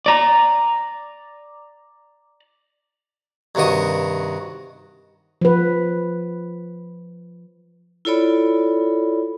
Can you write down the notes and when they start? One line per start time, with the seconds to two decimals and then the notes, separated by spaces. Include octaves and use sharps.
0.06 D5 A#5
3.55 G2 C3 D#3 F#4 D#6
5.41 F3 B4
8.05 E4 F4 A4 C#5 D5 B5